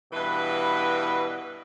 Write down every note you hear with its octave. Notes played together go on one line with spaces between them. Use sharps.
G2 B2 E3 B4